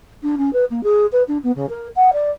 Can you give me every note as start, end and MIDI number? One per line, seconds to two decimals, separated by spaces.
0.23 0.36 62
0.38 0.53 61
0.53 0.65 71
0.70 0.81 58
0.83 1.06 68
1.12 1.23 71
1.28 1.38 62
1.44 1.52 59
1.56 1.66 49
1.69 1.88 70
1.96 2.10 78
2.13 2.31 74